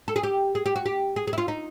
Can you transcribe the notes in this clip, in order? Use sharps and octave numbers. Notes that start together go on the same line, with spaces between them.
A4
G#4
G4
G#4
G4
F#4
G4
G#4
G#4
E4
F4
D#4